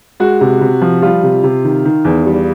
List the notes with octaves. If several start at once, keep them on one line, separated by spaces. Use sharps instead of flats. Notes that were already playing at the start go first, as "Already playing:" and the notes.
G#3 F#4
C3
C3
F3
G3 F4
C3
C3
D#3
D#3
E2
G3